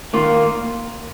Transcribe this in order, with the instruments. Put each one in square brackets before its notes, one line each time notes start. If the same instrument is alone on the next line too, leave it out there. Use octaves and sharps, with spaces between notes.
[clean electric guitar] D#3 A#3 F4